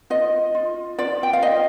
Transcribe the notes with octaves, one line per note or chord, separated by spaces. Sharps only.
F4 D#5
F4
F4 D5
G5
F5
F4 D#5